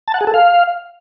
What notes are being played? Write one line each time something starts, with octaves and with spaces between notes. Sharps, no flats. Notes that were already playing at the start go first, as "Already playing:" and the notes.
A5
F#5
G#4
A4
F5